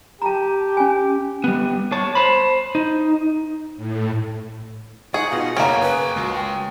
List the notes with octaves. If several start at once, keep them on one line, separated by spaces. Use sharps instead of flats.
G4 A5 A#5
C#4 G#5
G3 B3
C#5 A5
C5 B5
D#4
A2
D#4 G#4 F#5 C#6
B2 F4
C#3 A#3 C#4 C#5 G5 G#5
B4 D#6
C#2 G#3 F#4
G5